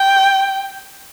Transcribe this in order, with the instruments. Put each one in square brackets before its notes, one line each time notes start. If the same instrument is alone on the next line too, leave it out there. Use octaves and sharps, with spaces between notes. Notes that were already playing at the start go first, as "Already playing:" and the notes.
Already playing: [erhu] G5